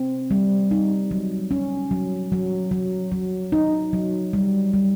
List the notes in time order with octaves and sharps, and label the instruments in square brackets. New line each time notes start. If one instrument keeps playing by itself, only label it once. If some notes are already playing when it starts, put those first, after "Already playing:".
Already playing: [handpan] C4
G3
D#4
F#3
C#4
F#3
F#3
F#3
F#3
D#4
F#3
G3
G3